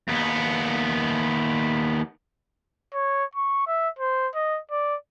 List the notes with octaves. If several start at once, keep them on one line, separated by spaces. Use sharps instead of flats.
D#2 B3
C#5
C#6
E5
C5
D#5
D5